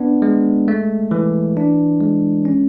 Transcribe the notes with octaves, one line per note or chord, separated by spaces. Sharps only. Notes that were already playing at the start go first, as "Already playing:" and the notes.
Already playing: B3 D4
G#3
A3
E3
D4
G#3
C#4